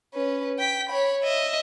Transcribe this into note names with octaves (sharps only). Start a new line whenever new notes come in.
C#4 B4
G5 B6
C#5 B5
D#5 E5